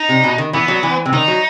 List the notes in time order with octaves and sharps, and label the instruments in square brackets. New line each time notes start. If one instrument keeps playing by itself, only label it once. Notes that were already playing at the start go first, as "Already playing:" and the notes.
Already playing: [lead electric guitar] D#4
[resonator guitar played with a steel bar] C3
B2
D#3
[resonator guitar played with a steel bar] E3 [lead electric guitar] B3
[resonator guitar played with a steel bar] F#3
E3
C3
[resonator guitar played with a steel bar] D#3 [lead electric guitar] D#4
[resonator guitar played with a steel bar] F#3